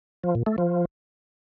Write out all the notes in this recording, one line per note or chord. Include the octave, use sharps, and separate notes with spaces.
F3
A#2
A3
F3